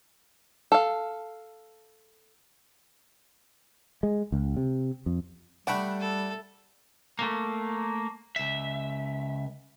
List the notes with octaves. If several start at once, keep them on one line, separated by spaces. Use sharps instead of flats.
A4 F5
G#3
C#2
C3
F2
G3 A3 D4 F#5 G5 B5
A4
A3 A#3
C#2 E5